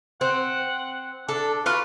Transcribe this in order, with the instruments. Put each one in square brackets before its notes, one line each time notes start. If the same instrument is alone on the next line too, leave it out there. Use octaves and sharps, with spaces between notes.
[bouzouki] C4 [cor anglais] F#5
[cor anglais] D4 [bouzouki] A4
[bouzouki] F4 B4 [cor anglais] F#4